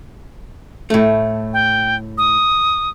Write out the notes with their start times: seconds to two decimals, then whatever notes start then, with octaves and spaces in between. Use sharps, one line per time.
0.90 A2 A3
1.53 G5
2.18 D#6